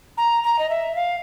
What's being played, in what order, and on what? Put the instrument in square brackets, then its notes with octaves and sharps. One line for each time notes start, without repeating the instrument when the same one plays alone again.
[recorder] A#5
A#5
D#5
E5
F5